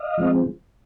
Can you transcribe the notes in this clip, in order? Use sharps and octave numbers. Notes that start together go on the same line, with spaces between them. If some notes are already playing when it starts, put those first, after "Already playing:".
Already playing: D#5 F5
F3 G#3 C4